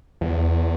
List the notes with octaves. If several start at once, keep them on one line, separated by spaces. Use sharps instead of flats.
E2